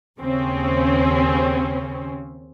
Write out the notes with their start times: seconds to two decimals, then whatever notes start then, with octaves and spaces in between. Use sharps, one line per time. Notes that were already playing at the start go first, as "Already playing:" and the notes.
0.19 D#2 C#3 C4 C#4